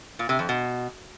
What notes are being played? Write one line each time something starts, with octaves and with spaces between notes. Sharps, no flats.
A#2
C3
F2
B2